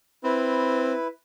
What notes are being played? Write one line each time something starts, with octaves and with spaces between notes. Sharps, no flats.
C4 E4 B4